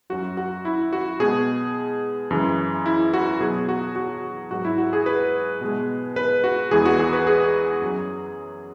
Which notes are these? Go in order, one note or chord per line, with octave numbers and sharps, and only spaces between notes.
F#2 F#3 F#4
F#4
E4
F#4
B2 G#3 G#4
F#2 C#3 E3 G#3
E4
F#4
B2 F#3 G#4
F#4
F#4
G#2 F#3 F#4
E4
F#4
G#4
B4
B2 G#3
B4
F#4
E2 E3 G#3 G#4
F#4
G#4
B4
G#4
F#2 F#3